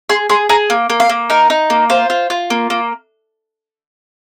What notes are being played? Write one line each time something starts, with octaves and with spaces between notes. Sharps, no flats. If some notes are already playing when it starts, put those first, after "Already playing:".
G#4 C6
G#4 C6
G#4 A#5
A#3
A#3
F5
A#3
D#4 A#4
D#4
A#3
F4 C5
F4
F4
A#3
A#3